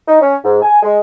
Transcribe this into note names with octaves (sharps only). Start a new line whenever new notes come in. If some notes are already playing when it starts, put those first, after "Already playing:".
D#4
C#4
G#2
G#5
G#3